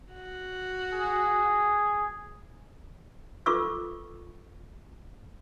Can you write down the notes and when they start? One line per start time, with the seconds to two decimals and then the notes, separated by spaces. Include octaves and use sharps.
0.13 F#4
0.93 G#4
3.46 F4 A4 B4 C#6 D6 E6